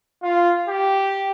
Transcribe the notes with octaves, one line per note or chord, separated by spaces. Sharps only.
F4
G4